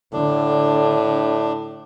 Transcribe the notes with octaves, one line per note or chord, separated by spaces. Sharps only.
A2 D3 D4